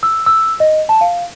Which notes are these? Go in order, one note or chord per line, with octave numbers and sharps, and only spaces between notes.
E6
E6
D#5
A5
F5